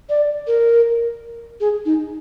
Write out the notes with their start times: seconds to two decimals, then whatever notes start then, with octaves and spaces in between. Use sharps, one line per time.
0.09 D5
0.47 A#4
1.60 G#4
1.86 D#4